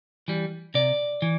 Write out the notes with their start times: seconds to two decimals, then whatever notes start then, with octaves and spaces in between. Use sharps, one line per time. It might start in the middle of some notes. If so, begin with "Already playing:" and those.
0.28 E3 G3
0.74 C3 D5
1.22 E3